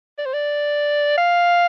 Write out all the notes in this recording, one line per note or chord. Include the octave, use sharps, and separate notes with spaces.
D5
C5
D5
F5